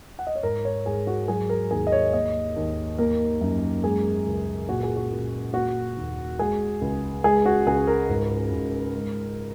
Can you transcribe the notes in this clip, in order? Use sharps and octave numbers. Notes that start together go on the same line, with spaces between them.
F#5
D#5
C#5
G#2 A#4
C#5
G#2 G#4
F#4
F#3 G#4
A#4
D#2 G#4
D#5
C#5
A#3 D#5
D#2
A#3 A#4
F#2
G#3 G#4
C#2
A#2 F#4
G#4
F#4
A#2
A#3 F#4
D#2
G#3 G#4
C#2
G#3 G#4
F#4
C#2 G#4
A#4
G#2
G#2
G#3